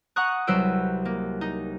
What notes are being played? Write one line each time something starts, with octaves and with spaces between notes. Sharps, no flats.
F#5 A#5 C#6 D#6 F#6
C2 F#3 B4 C5 E6 D7
A#3
D#4